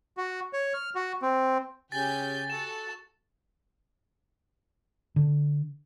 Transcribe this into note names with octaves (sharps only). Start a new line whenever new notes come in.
F#4
C#5
F6
F#4
C4
C#3 G4 G#5 G6 A6
F#4 A4 E7
D3